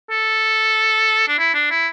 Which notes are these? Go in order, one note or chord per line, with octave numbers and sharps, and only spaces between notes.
A4
D4
E4
D4
E4